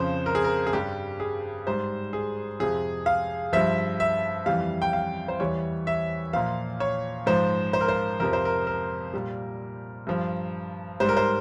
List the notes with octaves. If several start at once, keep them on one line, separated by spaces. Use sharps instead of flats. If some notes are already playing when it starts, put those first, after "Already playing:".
Already playing: F2 C#3 F3 C5
A#4
G#4
A#4
G#4
G2 G3 G4
G#4
G#2 G3 C5
G#4
F2 C3 F3 G#4
F5
G2 F3 E5
E5
F2 E3 G3 F5
G5
F5
C5
E2 E3 G3 C#5
E5
A#2 F3 F5
C#5
G#2 F3 C5
C5
A#4
C5
F2 C3 F3 A#4
C5
A#4
A#4
A#2 G3
G2 F3
G#2 G3 C5
A#4
C5